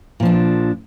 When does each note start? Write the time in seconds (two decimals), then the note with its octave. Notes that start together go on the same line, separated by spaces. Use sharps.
0.20 A#2
0.23 F3
0.25 D4